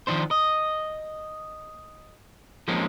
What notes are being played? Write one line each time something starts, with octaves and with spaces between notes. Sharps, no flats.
D#3 F3 D4 C5
D#5
F3 G#3 A#3 C4 C#4 D#4